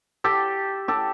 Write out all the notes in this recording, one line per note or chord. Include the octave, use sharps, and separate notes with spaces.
G4 A4
G4 A4